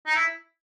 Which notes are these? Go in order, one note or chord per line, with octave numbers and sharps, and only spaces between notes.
D#4
E4